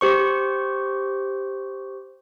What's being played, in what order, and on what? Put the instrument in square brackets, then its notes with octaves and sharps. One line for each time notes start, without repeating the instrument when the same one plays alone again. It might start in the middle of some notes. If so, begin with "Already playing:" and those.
[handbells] G4 C5 C#6